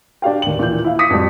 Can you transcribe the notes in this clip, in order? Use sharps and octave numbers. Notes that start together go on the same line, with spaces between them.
D4 G4 F5 G5
D#2 F#7
A#2 E3 G6
E4 F5
D6 D#6 A#6 B6 C#7
F2 G3